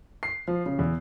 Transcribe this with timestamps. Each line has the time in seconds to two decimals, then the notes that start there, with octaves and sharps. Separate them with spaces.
0.23 C7
0.48 F3
0.66 C#3
0.79 E2